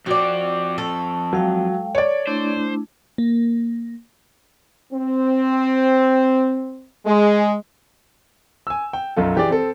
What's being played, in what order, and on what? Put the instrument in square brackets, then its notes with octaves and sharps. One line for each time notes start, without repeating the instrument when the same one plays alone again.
[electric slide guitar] F2 C4 [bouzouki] F#4 D5
[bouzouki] A4 [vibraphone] C#6
[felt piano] F#3 [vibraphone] G#3 F5 G5
[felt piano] C#5 D5
[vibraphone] A3 D4 E4 [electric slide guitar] C5
[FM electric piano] A#3
[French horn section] C4
G#3
[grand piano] G#5 E6
G5
B1 F#2 F4 A4
E3 G4 G#4 D5
C4 A4